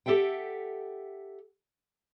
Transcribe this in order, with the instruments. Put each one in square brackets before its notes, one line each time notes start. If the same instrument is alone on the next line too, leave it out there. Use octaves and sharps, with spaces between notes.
[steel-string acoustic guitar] G4 A4 E5 F#5 G5